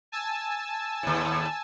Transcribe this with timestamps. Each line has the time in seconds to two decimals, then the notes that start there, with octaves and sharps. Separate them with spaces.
0.12 G#5 A5 E6
1.03 D#2 A2